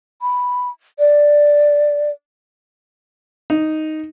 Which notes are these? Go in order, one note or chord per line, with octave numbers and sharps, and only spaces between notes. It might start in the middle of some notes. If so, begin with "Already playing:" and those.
B5
D5
D#4